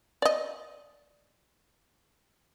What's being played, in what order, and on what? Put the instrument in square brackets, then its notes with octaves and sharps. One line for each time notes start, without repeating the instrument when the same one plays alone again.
[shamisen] D5 D#5